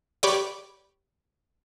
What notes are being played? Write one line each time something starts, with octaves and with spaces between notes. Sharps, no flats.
G4 B4 C#5 D5